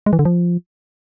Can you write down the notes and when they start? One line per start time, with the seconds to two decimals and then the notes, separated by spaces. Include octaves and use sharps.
0.06 G#3
0.13 E3
0.19 D3
0.25 F3